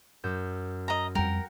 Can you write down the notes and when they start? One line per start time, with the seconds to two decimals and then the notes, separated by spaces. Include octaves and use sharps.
0.24 F#2 E6 G6
0.88 D#5 A#5
1.15 F2 G3 A#4 F#5 G5